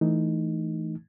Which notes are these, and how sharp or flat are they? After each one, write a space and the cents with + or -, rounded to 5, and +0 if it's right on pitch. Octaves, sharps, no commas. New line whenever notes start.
E3 +0 A3 +0 D#4 -5